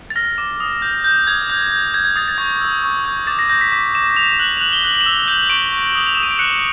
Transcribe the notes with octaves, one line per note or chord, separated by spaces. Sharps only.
A6
F6 A#6
D6
D#6
G6
G6
D#6 G#6
G6
G6
G6 G#6
G#6
D#6 A6
A6
C#6 G#6
E6
C#6
G6
D6 A6
A#6
G6 A#6
B6
D6 B6
D6 E7
C#6 F7
F#6 F#7
F7
F#6 F#7
G7
F#6 F#7
F#7
E7
E6 F7
G6 E7
C#6 D7
C#6
D#6
F7
D#6 E7
D#7
D7
F#6 C#7